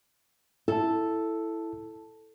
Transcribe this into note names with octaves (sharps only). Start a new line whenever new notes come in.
E4 A4 A5